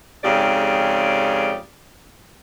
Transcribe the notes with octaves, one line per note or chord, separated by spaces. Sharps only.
F2 G#2 C#3 G4 D5